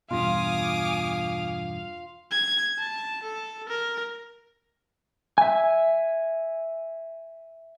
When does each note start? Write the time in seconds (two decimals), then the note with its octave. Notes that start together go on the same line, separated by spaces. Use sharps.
0.11 E2 G2 B2 F4 F5 G#5 D6 D#6
2.31 G#6
2.79 A5
3.23 A4
3.68 A#4
5.38 E5 G#5